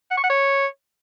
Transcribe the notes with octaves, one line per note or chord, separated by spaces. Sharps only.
F#5
C#6
F#5
C#5